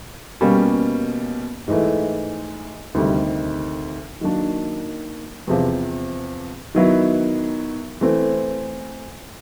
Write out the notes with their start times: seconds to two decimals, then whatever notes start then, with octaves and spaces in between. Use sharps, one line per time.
0.41 B2 G3 A#3 C#4
1.68 G#2 E3 A3
2.95 D2 C3 D#3 G3
4.21 D#3 F#3 A#3 D4
5.47 E2 C3 F3
6.75 D#3 F#3 B3 E4
8.01 E3 A3 C4